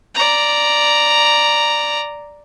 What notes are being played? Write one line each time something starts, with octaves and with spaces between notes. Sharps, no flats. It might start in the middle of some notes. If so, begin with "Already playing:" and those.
D5 A#5